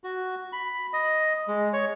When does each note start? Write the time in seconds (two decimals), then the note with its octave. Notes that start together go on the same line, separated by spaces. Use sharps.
0.04 F#4
0.53 B5
0.93 D#5
1.48 G#3
1.73 C#5